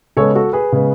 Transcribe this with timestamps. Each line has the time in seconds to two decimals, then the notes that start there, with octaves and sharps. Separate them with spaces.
0.17 C#3 G#3 B3 A4 C#5
0.35 F#4 A4
0.53 G#4 B4
0.72 C#3 G#3 B3